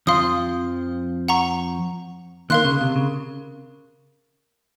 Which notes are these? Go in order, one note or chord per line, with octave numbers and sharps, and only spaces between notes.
F2 F3 F5 C6 D#6
F#5 A#5 C#6
D#2 D#3 A#4 F5 C6 F#6
C#3
C3
C#3